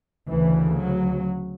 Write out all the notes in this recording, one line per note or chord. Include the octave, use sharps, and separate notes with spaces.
D2 C#3 E3
F#3